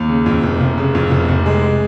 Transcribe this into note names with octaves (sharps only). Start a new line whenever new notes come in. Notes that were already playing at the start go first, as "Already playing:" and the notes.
Already playing: D#2
C#3
F2
F1
F1
C#3
F2
F1
F1
G#3